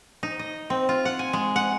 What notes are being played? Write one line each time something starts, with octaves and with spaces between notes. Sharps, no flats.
D#4
D#5
C4
F4
F#5
G#5
G#3
F#5